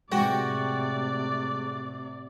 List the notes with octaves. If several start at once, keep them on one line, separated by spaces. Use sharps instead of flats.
A2 C3 G#3 F#4 D5 G5